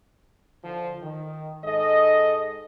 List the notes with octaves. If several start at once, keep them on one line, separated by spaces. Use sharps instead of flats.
D3 F3
D#3
G#2 A4 D#5